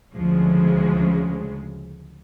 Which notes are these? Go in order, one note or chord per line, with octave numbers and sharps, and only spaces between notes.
D2 C#3 F3 G#3